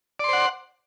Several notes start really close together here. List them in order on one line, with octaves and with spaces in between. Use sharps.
D5 C6 C5 F#5